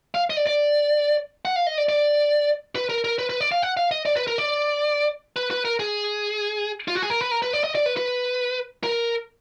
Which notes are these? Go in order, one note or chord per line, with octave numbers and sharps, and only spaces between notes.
F5
D#5
D5
D5
F#5
F5
D#5
D5
D5
B4
A#4
A#4
B4
B4
D5
F5
F#5
F5
D#5
D5
B4
A#4
D5
B4
B4
A#4
G#4
F4
F#4
G#4
A#4
B4
A#4
B4
D5
D#5
D5
B4
B4
A#4